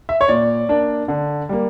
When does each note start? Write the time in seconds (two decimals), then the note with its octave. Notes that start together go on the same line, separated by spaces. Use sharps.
0.09 E5
0.21 C#5
0.28 A#2 D5
0.69 A#3 D4
1.08 D3
1.49 G3 A#3